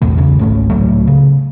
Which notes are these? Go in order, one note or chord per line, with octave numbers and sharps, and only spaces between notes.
A#1 E2 B2 A3
E1 A#1 E2 C#3
G#1 C#2 A3 C#4
C#2 A2 F#3 A3
C#3